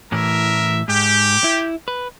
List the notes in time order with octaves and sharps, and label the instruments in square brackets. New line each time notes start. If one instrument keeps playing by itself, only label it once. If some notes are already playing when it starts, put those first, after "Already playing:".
[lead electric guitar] A2 E3 [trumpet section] A#4 E5
[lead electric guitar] G#2 [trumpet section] G4
[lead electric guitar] E4
B4